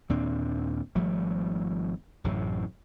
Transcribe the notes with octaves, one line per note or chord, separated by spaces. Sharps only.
D#2 A#2 C4 D4
G#1 F3 G3 A3
A1 F#2 A2 C3